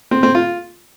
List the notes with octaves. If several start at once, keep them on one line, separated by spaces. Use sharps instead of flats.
C4
C4
F4